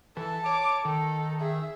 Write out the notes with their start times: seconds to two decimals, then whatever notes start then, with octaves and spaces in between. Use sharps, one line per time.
0.17 E3 A4 A5
0.46 C#5 D6
0.85 D#3 A4
1.40 G#4 E5